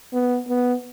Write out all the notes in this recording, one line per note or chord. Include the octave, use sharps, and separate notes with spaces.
B3
B3